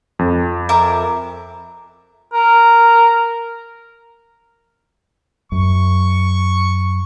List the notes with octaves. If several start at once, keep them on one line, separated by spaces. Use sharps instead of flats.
F2
A#4 E5 D6
A#4
F#2 C#6